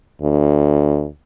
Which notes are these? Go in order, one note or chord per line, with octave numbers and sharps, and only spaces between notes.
D2